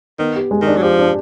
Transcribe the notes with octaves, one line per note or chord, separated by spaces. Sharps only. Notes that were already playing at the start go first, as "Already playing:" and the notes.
D#3 B3
G4
G#3
D#3
D4
F#3
F3 G4
D4